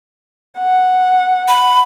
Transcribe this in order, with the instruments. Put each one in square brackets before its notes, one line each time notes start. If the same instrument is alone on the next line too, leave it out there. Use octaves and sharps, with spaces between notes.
[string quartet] F#5
[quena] B5